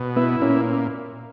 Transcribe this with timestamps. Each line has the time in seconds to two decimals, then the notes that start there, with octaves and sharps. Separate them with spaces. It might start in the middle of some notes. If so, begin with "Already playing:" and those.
Already playing: B2
0.16 B3 E4
0.41 A#2 C#4